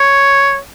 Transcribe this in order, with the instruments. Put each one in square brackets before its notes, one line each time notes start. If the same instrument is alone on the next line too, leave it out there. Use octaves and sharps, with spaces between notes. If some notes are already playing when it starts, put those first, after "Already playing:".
Already playing: [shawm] C#5